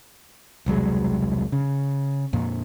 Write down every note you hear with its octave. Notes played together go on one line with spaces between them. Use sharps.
E1 C2 F#3 G#3
C#3
F2 A#2